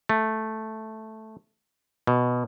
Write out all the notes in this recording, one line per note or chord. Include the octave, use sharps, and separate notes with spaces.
A3
B2